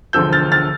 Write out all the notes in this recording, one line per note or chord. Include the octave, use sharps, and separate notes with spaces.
E1 D2 D3 F3 E6 G6
F6 A6
F6 A6